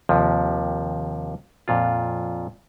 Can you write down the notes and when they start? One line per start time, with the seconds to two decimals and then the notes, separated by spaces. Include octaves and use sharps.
0.09 D#2 C3 F3
1.68 F2 A#2 F4